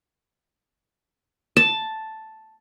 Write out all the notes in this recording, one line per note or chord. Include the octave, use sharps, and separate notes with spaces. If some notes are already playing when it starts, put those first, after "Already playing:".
A5